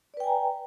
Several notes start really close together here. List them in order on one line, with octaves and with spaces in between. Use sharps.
D5 B4 G5 G#5 A#5